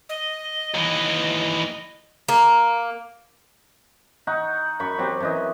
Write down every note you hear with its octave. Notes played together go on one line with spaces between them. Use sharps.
D#5
D#2 E3
A#3
D#4 F#5 C#6
F#2 B5 C#6
F#3 C4 G4
F#2 E3 D#5